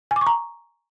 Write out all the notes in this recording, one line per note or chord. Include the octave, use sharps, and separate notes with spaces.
G#5
D6
C#6
A#5